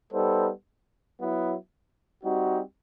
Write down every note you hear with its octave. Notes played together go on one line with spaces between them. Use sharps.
G3 B3 D#4 A4 C5
F#3 B3 E4
G3 C4 D#4 F#4